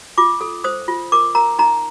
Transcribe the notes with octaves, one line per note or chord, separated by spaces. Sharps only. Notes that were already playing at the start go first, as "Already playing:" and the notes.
F4 D6
A4
C5 D#6
F4
A#4 D6
A#4 A#5
D#4 A#5